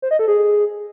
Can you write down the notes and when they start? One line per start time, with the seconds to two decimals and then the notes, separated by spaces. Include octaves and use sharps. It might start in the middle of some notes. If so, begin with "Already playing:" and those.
0.02 C5
0.11 D#5
0.19 A4
0.28 G#4